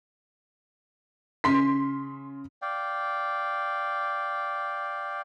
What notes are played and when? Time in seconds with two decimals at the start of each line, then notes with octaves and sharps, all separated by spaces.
1.44 C#3 C6 B6
2.62 D5 F5 G5